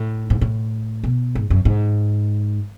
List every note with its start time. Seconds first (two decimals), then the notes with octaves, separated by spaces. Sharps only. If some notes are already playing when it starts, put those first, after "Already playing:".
Already playing: A2
0.30 G#2
0.41 A2
1.04 B2
1.35 G#2
1.50 F#2
1.65 G#2